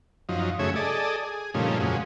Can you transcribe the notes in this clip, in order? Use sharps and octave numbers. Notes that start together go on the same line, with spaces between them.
F#2 F3 D#4
F#2 C#3 A3 G#4 C#5 E5
G#4 A4 D5 D#5
G#4
G2 A#2 C#3 F3 A3 D#4
F2 A#2 C#3 F#3 G#3